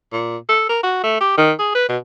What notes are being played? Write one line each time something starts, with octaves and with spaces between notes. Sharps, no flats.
A#2
A4
A#4
F#4
A3
G4
D#3
G#4
B4
B2